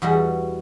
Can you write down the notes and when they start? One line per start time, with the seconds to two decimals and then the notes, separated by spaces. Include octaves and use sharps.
0.02 E2 B2 G3 F#4